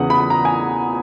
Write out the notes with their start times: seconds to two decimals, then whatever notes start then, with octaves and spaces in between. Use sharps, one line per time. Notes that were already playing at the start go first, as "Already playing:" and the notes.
Already playing: E2 C#3 E3 F#5 D#6
0.10 B5
0.20 B5
0.30 A#5
0.45 G#5